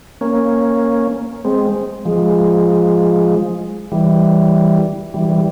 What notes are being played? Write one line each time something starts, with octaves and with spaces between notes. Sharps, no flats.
A#3 C#4
G#3 C4
F3 G#3
E3 G3
E3 G3
E3 G3